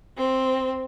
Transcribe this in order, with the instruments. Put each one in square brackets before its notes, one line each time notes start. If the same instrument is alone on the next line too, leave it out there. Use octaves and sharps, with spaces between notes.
[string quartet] C4